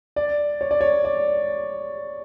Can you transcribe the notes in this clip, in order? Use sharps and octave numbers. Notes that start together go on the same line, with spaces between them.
D5
C#5
D5
C#5
D5